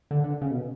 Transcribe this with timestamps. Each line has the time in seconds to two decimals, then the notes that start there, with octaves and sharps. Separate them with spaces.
0.11 D3
0.24 D3
0.41 C#3
0.51 B2